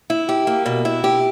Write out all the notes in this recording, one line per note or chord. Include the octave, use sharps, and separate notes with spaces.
E4
G4
A#3
B2
E4
G4